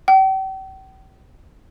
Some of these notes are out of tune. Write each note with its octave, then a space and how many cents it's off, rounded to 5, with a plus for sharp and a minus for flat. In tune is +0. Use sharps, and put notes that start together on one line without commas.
G5 -40